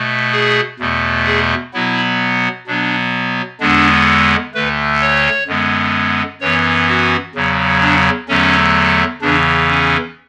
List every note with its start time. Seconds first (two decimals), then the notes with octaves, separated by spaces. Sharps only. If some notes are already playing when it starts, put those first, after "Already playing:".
Already playing: B2 A3
0.33 G#4
0.80 E2 B2 A3
1.26 G#4
1.74 B2 F#3 B3 E4
2.67 B2 F#3 B3 D4
3.60 E2 D3 G#3 B3 D4
4.54 D2 D3 A3 B4
5.02 C#5
5.47 F#2 D3 G#3 B3
6.41 F#2 E3 B3 C#5
6.89 F#4
7.35 E2 C#3 F#3
7.81 D4
8.28 E2 D3 F#3 A3 C#4
9.22 E2 C#3 E3 D4
9.69 C#4